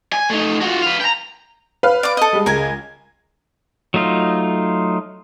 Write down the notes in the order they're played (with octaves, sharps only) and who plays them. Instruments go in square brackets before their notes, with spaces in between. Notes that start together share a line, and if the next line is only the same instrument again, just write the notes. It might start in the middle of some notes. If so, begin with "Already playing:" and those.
[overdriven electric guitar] G#5
A3 D#4
F4 F#4
B4 F5
G5 A#5
[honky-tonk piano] B4 F5 F6
[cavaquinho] D5 D6
A4 D#5
[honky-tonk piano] G3 G#3
[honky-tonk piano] C#2 G#4 G#6 [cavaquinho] A#4 G#5
[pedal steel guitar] F#3 A3 D#4 F4